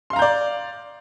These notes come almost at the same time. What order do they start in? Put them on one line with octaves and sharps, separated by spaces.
C6 F5 A#5 G6 D5